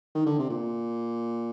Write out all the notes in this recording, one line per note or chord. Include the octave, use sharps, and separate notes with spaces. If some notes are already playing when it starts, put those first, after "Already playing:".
D#3
D3
C3
A#2